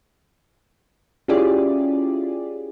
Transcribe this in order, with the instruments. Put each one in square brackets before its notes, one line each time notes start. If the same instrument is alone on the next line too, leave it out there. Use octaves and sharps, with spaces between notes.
[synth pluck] C#4 E4 F4 G4 G#4 D5